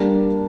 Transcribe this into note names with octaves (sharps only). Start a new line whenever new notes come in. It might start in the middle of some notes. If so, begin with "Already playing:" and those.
Already playing: G3 A#3 D4